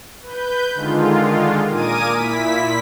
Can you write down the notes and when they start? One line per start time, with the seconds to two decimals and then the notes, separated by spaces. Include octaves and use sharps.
0.22 B4 G6
0.74 D3 D#3 G#3 F4
1.70 A#2 A#4 G#5 D6 D#6 D#7
2.14 A#2 E4 B6